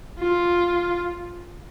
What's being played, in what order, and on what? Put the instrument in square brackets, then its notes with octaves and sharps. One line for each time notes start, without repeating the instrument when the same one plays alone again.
[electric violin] F4